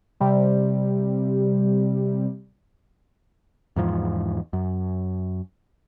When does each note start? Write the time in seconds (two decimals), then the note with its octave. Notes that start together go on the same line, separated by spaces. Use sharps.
0.20 C3 G3
3.76 E2 G#2 F3
4.53 F#2